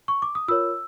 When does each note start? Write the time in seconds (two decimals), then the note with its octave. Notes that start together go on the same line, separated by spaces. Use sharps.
0.08 C#6
0.22 D6
0.35 D#6
0.48 F4 A#4 C#5 E6